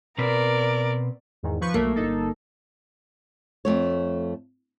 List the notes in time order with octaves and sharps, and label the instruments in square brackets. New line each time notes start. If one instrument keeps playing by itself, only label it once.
[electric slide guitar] B2 C4 B4 [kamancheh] A#4 D5
[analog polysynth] E2 G#2 D#3
F3 B4 C#6
[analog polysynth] B1 A3 [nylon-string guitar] A#3
[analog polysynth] G1 D#4 A4
[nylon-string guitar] F2 A3 C#5